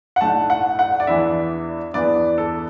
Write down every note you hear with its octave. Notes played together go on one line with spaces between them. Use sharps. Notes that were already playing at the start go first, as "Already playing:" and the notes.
F#5
B1 A2 A3 D4 A5
F#5
F#5
D5
E2 E3 B3 D4 E5
E2 E3 B3 D4 D5
A4